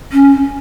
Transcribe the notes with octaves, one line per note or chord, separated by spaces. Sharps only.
C#4